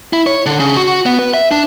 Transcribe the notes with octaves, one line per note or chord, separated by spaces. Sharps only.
E4
C#5
D3
C#3
F#4
B3
B4
E5
D4